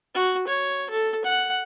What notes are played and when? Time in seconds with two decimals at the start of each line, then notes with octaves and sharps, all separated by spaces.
0.15 F#4
0.48 C#5
0.90 A4
1.25 F#5